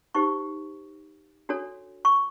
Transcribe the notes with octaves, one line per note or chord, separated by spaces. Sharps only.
D#4 G4 C5 C#6
D4 F#4 A4 C#5
C#6